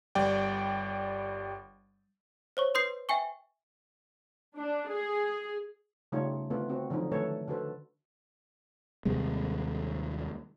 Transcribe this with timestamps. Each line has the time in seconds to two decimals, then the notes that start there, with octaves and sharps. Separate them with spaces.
0.15 G1 G3 D5 G5
2.57 C5 C#5 C#6
2.74 B4 C6 D#6 G6 C7
3.09 E5 G5 G#5 C#6
4.57 D4
4.89 G#4
6.12 C#3 G3 A3 D#4 F4 C#5
6.50 D3 A3 B3 C4 F4 B4
6.69 C4 F#4
6.90 D3 F3 F#3 D#4
7.11 D3 D#3 A3 A4 B4 C#5
7.48 D3 D4 F#4 A4 B4 C5
9.05 D#2 C3 G3 G#3